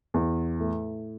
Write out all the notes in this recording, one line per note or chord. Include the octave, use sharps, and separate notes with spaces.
E2
A2